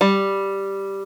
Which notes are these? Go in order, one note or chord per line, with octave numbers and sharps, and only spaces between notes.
G3